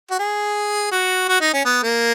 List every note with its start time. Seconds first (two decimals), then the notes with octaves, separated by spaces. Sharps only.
0.11 F#4
0.19 G#4
0.91 F#4
1.29 F#4
1.41 D#4
1.53 C#4
1.65 B3
1.83 A#3